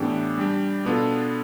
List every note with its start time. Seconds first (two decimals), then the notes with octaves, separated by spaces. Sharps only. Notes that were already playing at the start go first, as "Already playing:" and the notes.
Already playing: A2 E3 B3 D4 G4
0.38 G3 D4 G4
0.85 B2 B3 D4 F4 A4